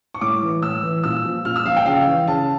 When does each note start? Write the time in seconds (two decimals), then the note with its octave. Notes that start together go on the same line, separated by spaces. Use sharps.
0.14 C#6
0.21 A2 D6
0.43 E3
0.62 A2 E6
0.83 E3
1.03 A#2 E6
1.25 F3
1.45 A#2 F6
1.56 E6
1.66 F3 F5
1.76 G5
1.86 C#3 F5
2.07 E3
2.27 C#3 A5